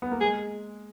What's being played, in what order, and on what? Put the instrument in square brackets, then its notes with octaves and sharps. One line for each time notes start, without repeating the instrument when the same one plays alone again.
[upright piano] B3
A#3
[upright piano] G#3 [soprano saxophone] G#4